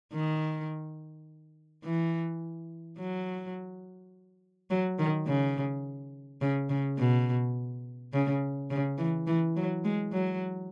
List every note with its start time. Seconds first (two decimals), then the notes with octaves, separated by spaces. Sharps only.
0.13 D#3
1.84 E3
2.98 F#3
4.70 F#3
4.99 D#3
5.27 C#3
6.41 C#3
6.70 C#3
6.98 B2
8.13 C#3
8.71 C#3
8.98 E3
9.27 E3
9.56 F#3
9.84 G#3
10.12 F#3